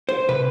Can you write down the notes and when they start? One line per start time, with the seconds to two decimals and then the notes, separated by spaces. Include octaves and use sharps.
0.09 C5
0.29 C3 B4